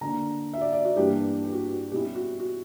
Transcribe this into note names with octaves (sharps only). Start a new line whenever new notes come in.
D3 A#3 D4 A#5
E5
D5
D5
F#4
G2 E3 G3 A#3 D4 G4
G4
F#4
F#4
B2 G3 C#4 E4 G4
F#4
F#4